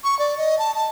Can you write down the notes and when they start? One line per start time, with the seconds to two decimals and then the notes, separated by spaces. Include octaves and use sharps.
0.04 C#6
0.19 D5
0.38 D#5
0.59 A5
0.75 A5